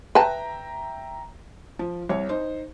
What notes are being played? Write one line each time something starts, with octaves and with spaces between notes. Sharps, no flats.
B4 E5 G5 A5 A#5
F3
C2 C#5
D#4 C5